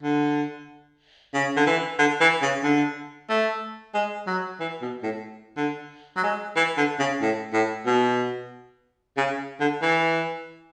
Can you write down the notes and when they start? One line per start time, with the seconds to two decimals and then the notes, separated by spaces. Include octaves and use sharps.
0.02 D3
1.34 C#3
1.57 D3
1.66 E3
1.99 D3
2.21 E3
2.42 C#3
2.63 D3
3.29 A3
3.94 G#3
4.27 F#3
4.60 E3
4.82 B2
5.03 A2
5.57 D3
6.16 F#3
6.24 G#3
6.56 E3
6.77 D3
6.99 C#3
7.21 A2
7.53 A2
7.86 B2
9.17 C#3
9.60 D3
9.82 E3